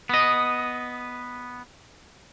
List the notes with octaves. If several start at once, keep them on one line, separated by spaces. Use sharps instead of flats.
B3 D#5